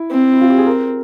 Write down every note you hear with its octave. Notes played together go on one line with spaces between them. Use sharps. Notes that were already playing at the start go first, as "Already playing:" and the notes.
Already playing: E4
C4
E4
F4
G4
G#4
A#4